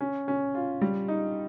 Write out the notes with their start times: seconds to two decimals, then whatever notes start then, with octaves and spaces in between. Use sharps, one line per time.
0.01 C#4
0.28 C#4
0.55 F4
0.81 G3
1.08 D#4